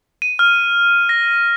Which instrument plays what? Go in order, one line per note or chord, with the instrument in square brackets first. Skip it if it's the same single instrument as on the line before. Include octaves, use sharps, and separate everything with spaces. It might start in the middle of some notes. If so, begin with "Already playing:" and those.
[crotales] D#7
F6
A#6